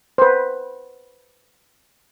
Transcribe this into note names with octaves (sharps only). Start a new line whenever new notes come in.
B4 C5